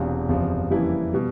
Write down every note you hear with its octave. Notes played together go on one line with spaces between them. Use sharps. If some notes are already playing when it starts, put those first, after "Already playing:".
Already playing: E1 E2 C3 F4
F#1 E2 C3 F3
F2 C#3 E3 G3 A#3 E4
B2 G3